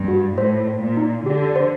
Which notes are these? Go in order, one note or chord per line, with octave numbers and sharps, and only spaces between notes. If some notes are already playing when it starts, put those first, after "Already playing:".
Already playing: G2
F#4
A2 C5
C5
A#2
D#4
D3 G4
C5